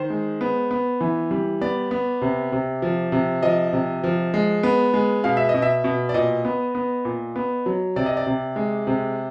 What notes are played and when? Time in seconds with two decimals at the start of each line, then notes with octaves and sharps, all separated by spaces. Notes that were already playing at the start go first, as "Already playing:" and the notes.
Already playing: D#3 C5
0.10 G#3
0.41 B3
0.71 B3
1.01 E3
1.31 G3
1.61 B3 D5
1.91 B3
2.22 C3
2.52 C3
2.82 F3
3.12 C3
3.42 F3 D#5
3.73 C3
4.04 F3
4.34 G#3
4.63 B3
4.94 G#3
5.24 B2 F5
5.37 E5
5.49 D#5
5.54 B2
5.62 E5
5.84 B2
6.09 D5
6.14 A#2 D#5
6.45 B3
6.75 B3
7.05 A#2
7.36 B3
7.66 F#3
7.96 C3 D5
8.06 D#5
8.17 D5
8.27 C3
8.56 G#3
8.87 C3